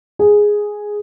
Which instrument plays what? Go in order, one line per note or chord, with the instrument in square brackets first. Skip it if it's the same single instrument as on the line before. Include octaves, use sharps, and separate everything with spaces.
[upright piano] G#4